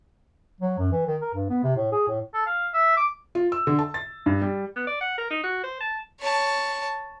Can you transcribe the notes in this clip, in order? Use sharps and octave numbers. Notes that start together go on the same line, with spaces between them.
F#3
F#2
E3
D#3
A#4
G2
B3
C3
A2
G#4
A2
A4
F5
E5
D6
F4
E6
D3
A5
A6
G2
G3
B3
D5
F#5
A#4
D#4
F#4
C5
A5
C#5 A5